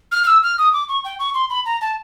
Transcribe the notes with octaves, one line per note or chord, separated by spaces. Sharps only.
F6
F6
E6
F6
D#6
D6
C#6
G5
C#6
C6
B5
A#5
A5